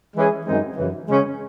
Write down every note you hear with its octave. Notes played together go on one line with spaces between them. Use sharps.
E3 G#3 C#4 G#4
F#2 D#3 G#3 C4 D#4
F#2 C#3 E3
C#3 G#3 C#4